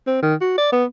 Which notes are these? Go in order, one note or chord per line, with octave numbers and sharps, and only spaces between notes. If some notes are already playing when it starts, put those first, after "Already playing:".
C4
D#3
F#4
D5
B3